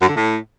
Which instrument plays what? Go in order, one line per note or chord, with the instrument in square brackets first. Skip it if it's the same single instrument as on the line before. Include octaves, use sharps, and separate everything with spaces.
[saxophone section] F#2
D3
A2